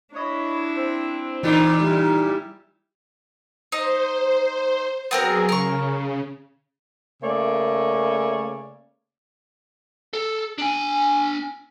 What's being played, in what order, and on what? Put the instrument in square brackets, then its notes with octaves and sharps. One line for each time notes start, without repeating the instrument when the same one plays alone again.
[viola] D4 E4 [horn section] C#5 D#5 B5
[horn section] C4
[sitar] A#2 C#3 F4 [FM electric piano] E3 D#4 D6
[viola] G3 E4
[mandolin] D#4 [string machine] C5
[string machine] F#3 G#4 [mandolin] B3 C4 A#4
[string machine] C#3 [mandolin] A#4 C#6
[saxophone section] C#3 A3 A#3 C#5 D5
[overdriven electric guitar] A4
D4 G#5